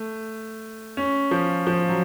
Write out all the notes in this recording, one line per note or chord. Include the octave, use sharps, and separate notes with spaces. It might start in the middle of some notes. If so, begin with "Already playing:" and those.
Already playing: A3
C#4
F3
F3
F#3